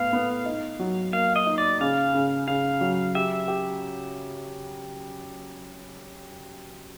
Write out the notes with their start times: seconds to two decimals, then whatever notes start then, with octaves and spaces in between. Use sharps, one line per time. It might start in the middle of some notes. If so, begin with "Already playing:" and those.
Already playing: A2 B3 F5
0.13 B3
0.45 D#4
0.80 F#3
1.13 A#3 F5
1.36 D#5
1.46 D#4
1.58 D5
1.80 C#3 F5
2.14 C#3
2.48 C#3 F5
2.81 F#3
3.15 G4 E5
3.48 G4